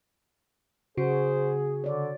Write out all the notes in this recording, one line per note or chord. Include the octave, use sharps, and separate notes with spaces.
C#3 F#4 G#4 C5
D3 C#5 D5